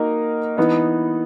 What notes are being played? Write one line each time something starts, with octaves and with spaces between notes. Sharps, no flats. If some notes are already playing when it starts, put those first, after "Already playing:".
Already playing: A#3 D#4 F#4 A#4 D#5
E3 B3 D#4